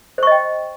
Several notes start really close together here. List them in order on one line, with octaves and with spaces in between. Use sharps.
C5 C#6 D#5 G5